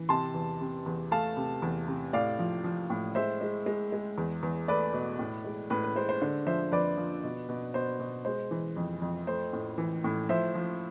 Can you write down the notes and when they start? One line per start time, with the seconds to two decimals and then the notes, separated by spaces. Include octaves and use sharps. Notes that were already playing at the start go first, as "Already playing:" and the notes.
Already playing: E3
0.09 C3 A5 C6
0.34 E2
0.61 C3
0.86 E2
1.11 A3 F5 A5
1.37 C3
1.62 E2
1.88 C3
2.13 A2 D5 F5
2.39 F3
2.64 F3
2.90 A2
3.15 G#3 C5 E5
3.41 G#3
3.66 G#3
3.92 G#3
4.18 E2
4.43 E2
4.68 A3 B4 D5
4.93 B2
5.19 A2
5.45 G#3
5.70 A2 B4
5.83 B4
5.96 G#3 C5
6.09 C5
6.22 D3 C5
6.47 F3 C5 E5
6.72 F2 B4 D5
6.97 F3
7.23 B2
7.49 B2
7.74 B2 C5
8.00 B2
8.25 G#3 C5
8.51 E3
8.76 F2
9.02 F2
9.27 A3 C5
9.53 A2
9.78 E3
10.04 A2
10.29 F3 C5 E5
10.55 F3